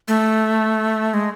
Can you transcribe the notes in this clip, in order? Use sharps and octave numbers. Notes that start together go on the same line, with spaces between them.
A3
G#3